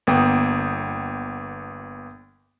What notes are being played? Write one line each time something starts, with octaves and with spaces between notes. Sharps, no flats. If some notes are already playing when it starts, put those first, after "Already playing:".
G1 A#3 B3 G5 D#6